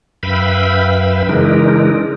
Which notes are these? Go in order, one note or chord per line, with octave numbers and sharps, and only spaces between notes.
F#2 B4 E5 F5 G5 B5
C#3 E3 G#3 D4 D#4 A#4